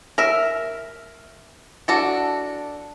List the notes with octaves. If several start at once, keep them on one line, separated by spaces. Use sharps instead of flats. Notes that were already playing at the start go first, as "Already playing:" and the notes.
A#4 E5
D4 F#4 A4